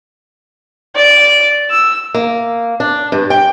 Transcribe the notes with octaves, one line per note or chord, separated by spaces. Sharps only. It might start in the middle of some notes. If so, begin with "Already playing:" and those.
D5
E6
A#3
D4
G2
G5